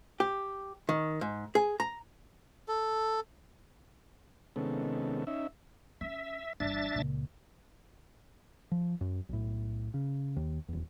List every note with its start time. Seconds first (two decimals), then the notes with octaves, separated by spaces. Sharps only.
0.20 G4
0.89 D#3
1.21 G#2
1.55 G#4
1.80 A#5
2.68 A4
4.56 C3 D#3 G#3 B3 C#4 A4
5.27 C#4 D#4 E5
6.01 C#4 E5
6.60 G1 E3 D4 E5 A6
6.95 C#2 A#2
8.71 F3
9.01 F#2
9.29 B1 A2
9.94 C#3
10.36 D#2
10.68 D#1 E2